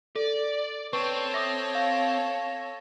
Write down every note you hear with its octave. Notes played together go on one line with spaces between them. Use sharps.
A4 D5
C4 A4 B4 C#5 C#6
E5 D6 D#6 A#6
F5